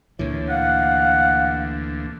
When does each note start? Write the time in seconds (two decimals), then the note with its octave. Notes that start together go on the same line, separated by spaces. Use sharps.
0.19 D2 A#2 E3 C#5
0.50 F5 F#5